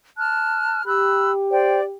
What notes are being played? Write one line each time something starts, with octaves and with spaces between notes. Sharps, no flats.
A5 F6 F#6
G4 B5 E6 F#6
C5 D5 G5